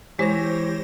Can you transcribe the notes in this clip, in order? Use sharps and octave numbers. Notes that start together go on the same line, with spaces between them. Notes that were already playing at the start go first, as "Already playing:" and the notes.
E3 G#3 G4 C5 C#5 A#6